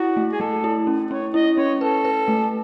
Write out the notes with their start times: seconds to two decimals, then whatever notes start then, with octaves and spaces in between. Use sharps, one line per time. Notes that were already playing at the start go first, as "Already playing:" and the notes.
Already playing: E4 F#4
0.17 A3
0.32 G#4
0.40 A3 A4
0.64 E4
0.87 C#4
1.11 C#4 C#5
1.34 E4 D#5
1.57 C#4 C#5
1.81 A4 B4
2.05 B4
2.28 A3